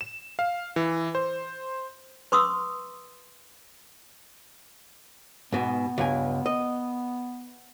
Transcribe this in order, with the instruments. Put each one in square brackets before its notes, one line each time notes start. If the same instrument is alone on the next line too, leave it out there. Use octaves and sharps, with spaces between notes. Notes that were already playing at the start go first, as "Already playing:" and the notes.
[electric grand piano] E7
F5
E3
C5
[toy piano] B4 C6 C#6 D#6 E6
[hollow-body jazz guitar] G#2 B2 [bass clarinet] B3
[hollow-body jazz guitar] C#2 G2 G#5
D#5